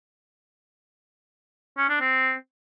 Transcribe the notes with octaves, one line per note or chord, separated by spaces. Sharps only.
C#4
D4
C4